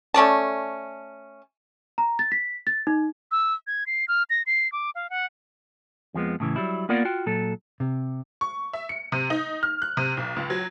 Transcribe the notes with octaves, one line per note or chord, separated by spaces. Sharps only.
A3 C#4 D5 A5
A#5
A6
B6
A6
D#4
E6
G#6
C7
F6
A#6
C7
D6
F5
F#5
F2 F3 G#3 B3
A2 C#3 E3
F#3 G3 E4
A#3 B3 F4 A#4 D5 F#5
F4 F#4 G5
A#2 F#3 A4
C3
C#6
E5
C#7
C3
D#4
F6
F#6
C3
B1
C#2
F#3